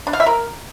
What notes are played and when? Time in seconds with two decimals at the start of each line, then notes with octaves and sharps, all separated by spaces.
0.07 D4
0.13 F5
0.20 E5
0.26 A#4